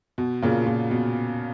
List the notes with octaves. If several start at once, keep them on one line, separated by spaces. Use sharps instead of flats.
B2
A#2 C#3
A#2
B2